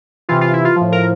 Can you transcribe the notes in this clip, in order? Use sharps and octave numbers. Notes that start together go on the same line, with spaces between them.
C3 E3 F4
F4
E4
F4
A2 F3
A#4